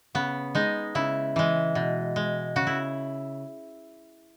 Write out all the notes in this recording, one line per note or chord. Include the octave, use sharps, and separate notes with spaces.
C#3 B3
G#3 D#4
C#3 E4
E3 G#3
B2
G#3
C#3 F#4
E4